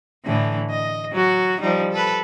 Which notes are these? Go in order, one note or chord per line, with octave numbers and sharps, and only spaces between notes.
A2 D3 E3
D#5
F#3 F#4
F3 G3 D#4
A4 B4